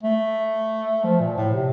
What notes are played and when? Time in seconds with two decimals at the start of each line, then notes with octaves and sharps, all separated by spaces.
0.03 A3
1.04 F3
1.20 A#2
1.37 A2
1.53 C3